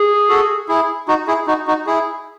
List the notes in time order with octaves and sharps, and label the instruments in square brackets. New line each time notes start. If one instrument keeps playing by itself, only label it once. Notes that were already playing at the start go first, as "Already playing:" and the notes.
Already playing: [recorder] G#4
[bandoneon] F#4 A4
E4 G#4
D#4 F#4
E4 G#4
D#4 F#4
D#4 F#4
E4 G#4